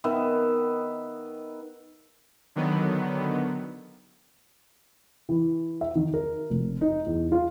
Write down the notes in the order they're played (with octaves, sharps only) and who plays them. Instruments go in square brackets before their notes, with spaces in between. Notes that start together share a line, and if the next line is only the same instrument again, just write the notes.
[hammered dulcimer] D#3 B3 E5
[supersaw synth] D3 D#3 F#3 B3
[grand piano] E3
E5
D#3
A#4
F1
D#4
E2
F4